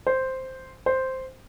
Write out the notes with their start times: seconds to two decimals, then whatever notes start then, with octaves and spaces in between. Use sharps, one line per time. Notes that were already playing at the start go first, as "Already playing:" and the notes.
0.07 C5
0.86 C5